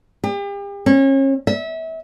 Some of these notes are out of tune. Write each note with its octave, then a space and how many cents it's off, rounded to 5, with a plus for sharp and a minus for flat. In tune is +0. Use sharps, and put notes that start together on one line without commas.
G4 +40
C#4 -35
E5 -30